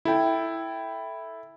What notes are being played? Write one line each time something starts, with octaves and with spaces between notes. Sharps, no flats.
E4 A4 G5